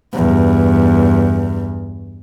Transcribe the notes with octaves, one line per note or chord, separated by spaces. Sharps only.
E2 G2